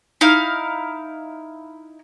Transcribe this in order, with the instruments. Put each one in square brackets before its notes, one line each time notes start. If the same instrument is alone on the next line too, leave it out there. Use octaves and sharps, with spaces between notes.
[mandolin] D#4 E4 F5